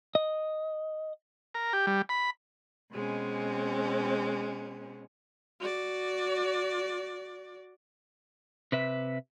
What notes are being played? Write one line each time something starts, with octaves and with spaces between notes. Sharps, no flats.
D#5
A#4
G4
G3
B5
B2 G#3 C4 C#4
F#4 D5
C3 B4 E5